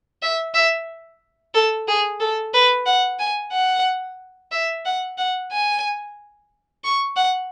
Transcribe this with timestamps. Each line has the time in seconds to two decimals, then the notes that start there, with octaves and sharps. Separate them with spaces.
0.22 E5
0.54 E5
1.54 A4
1.88 G#4
2.20 A4
2.54 B4
2.86 F#5
3.19 G#5
3.52 F#5
4.52 E5
4.85 F#5
5.18 F#5
5.52 G#5
6.84 C#6
7.16 F#5